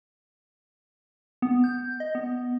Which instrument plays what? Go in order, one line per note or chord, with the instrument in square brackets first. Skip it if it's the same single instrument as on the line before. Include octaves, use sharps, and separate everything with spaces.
[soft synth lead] B3
G6
D#5
B3